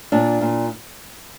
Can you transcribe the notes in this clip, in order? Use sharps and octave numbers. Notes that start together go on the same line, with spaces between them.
A#2 D4
A#2